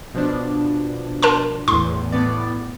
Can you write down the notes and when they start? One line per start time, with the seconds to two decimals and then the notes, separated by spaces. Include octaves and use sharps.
0.15 B2 F3 D4
1.23 A#4 A5 C6
1.68 E2 A2 C6
2.12 A2 B3 D5